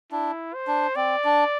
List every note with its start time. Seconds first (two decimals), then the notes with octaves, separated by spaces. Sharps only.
0.12 D4 E4
0.54 C5
0.67 D4
0.96 C4 D5
1.24 D4